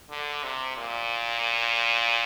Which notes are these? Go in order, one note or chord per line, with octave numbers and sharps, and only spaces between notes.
D3
C3
A#2